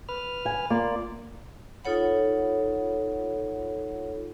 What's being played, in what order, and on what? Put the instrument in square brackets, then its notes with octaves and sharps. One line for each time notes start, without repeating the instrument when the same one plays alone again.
[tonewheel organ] B4 F6
[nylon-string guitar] F#5 G#5
[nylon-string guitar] A#3 [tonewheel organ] F4 D5
[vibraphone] D#4 F4 A4 C#5 F#5 B5